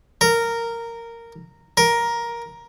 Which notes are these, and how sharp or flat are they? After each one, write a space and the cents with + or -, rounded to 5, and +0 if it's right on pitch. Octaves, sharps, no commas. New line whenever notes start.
A#4 -10
A#4 +10